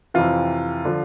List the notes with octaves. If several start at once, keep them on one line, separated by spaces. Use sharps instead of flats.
F2 C3 E3 F4
D3 F3